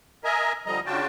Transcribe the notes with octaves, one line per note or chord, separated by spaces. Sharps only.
A#4 D#5 E5 G#5 A#5
D3 F3 G3 D#5 A#5
C#3 D4 F4 F#4 G5 A5